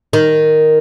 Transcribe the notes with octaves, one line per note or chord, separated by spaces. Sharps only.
D#3